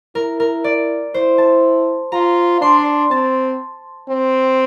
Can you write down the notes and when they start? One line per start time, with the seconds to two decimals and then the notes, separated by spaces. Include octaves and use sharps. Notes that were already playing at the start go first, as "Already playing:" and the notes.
0.15 E4 A#4
0.40 A#4
0.64 D5
1.14 E4 C5
1.38 A5
2.12 F4 A#5
2.61 D4 C6
2.79 C6
3.11 C4 A5
4.09 C4